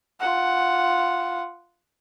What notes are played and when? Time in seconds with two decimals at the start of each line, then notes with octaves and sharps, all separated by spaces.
0.20 F4 F#5